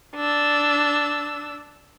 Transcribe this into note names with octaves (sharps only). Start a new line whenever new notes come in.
D4 E6